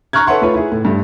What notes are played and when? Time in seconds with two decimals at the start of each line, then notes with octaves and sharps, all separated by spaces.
0.13 A#5 C#6 F6 F#6 G#6
0.27 A4 B4 C#5 E5 F#5 C6
0.41 A3 F4 B4 C#5
0.54 E4 G#4
0.72 A2
0.85 G2 A3